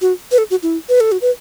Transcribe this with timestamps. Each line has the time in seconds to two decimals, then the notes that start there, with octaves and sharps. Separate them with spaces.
0.01 F#4
0.32 B4
0.38 A4
0.50 F#4
0.63 E4
0.89 B4
1.00 A4
1.12 F#4
1.21 B4